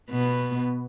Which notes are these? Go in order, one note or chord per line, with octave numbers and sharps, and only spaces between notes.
B2 B3